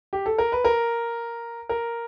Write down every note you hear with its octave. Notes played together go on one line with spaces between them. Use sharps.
G4
A4
A#4
B4
A#4
A#4